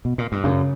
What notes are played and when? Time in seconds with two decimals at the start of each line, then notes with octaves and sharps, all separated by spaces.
0.05 B2
0.18 A#2
0.32 G2
0.44 F#2 C#3